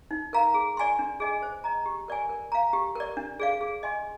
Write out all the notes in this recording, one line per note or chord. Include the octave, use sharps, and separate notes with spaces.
D#4
A#4 F5 A#5
G#4
D5 G#5 C6
D4
G#4 D#5 G#5
C5
D#5 A#5
G4
A#4 D5 G#5
A#4
F5 A#5
G4
A#4 D5
D4
G#4 D5 F5
G#4
D#5 G#5 C6